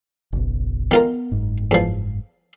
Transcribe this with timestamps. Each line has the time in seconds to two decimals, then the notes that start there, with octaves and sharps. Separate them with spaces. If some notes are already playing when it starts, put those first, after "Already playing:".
0.33 F#1 B1
0.91 D#3 B3 F4 A#4
1.32 F#1 G#2
1.71 E2 F3